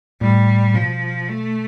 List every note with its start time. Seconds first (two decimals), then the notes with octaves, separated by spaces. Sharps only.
0.21 A2 G3
0.74 B2 F3
1.28 A3